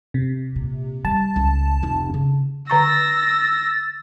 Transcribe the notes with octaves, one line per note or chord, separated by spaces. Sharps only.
C3
A#2
G3 A5
C#2
F1 F4
C#3
D3 A#5 C#6 E6 A6 A#6